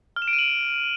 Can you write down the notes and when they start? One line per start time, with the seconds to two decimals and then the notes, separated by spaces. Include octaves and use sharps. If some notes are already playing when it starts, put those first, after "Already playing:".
0.16 F6
0.22 E7
0.28 D7
0.33 D#7
0.39 F#7